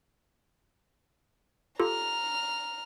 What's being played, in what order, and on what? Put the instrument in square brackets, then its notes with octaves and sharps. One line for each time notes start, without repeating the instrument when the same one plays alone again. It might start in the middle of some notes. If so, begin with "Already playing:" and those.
[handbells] F4 G4 A4 [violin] A#5 F6